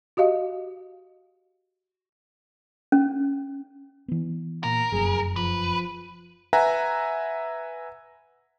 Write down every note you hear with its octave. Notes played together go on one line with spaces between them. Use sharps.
F#4 G4 D#5 F5
C#4
E3 B3
A#2 A#4
F1 F#2 G#4
F3 B4
B4 E5 F#5 G#5 A#5